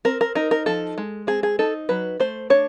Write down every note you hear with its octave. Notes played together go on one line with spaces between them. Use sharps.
C4 A#4
A#4
D#4 A#4
A#4
F3 A4
G#3
C4 G#4
G#4
D#4 A4
F#3 B4
A3 C5
D4 C#5